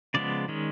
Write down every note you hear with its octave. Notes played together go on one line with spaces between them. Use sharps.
C#3 F3 G#3 B3 D5
D#3 G#3 C#4